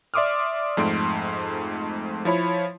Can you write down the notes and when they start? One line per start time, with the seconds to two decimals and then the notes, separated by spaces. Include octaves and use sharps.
0.14 D5 E5 C6 D6 D#6 F6
0.77 F2 G#2 A3 C6 D7
2.25 F3 E4 C#5 B5